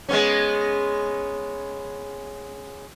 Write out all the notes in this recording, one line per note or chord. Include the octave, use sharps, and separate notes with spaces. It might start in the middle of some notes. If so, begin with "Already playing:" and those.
G#3 B3 C#4